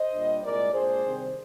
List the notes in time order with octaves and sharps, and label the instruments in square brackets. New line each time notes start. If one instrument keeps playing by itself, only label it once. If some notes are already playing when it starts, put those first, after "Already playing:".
Already playing: [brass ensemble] C5 D#5
A#2 G3 D4
C2 A#2 G#3 A#4 D5
A#2 G#3 D4 G#4 C5
C3 D#3 G3 C4